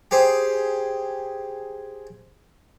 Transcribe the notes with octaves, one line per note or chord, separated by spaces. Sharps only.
G4 G#4 C5